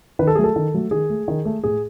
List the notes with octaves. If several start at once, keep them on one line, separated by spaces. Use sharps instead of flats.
D#3 B4
A4
F#3 A3 G#4
A4
D#3
F#3 A3
D#3 G#4
A3
D#3
A3
A2 G#4